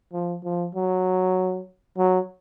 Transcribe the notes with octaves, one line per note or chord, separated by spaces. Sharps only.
F3
F3
F#3
F#3